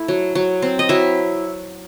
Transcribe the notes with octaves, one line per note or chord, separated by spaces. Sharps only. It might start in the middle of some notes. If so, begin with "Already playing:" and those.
Already playing: A3 E4
F#3
F#3
C4
D#5
F#3 E4 E5